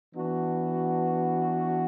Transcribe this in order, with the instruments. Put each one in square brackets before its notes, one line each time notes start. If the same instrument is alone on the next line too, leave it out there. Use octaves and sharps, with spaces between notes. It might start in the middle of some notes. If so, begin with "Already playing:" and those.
[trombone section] E3 B3 D4 F#4